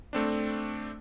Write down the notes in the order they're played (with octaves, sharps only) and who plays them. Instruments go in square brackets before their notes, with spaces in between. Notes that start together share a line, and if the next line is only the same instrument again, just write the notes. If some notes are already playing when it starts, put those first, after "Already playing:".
[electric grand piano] A3 C4 D4